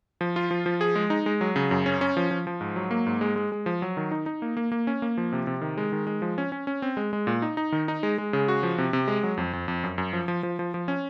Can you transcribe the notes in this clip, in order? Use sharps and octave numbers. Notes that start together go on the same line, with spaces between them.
F3
F4
F3
F3
G#4
G#3
D#4
G#3
F#3
C#3
F#2
C#4
C#4
F3
F3
F3
G#2
F#3
A#3
G#2
G#3
G#3
G#3
F3
F#3
D#3
D#4
D#4
A#3
A#3
A#3
C#4
A#3
F3
C3
C3
D#3
G#3
D#3
G#3
F3
C#4
C#4
C#4
C4
G#3
G#3
A#2
D#4
D#4
D#3
D#4
G#3
G#3
C#3
F#4
F3
C3
C3
G#3
F#3
F2
F2
F2
F#2
F#2
F3
F3
F3
F3
F3
C#4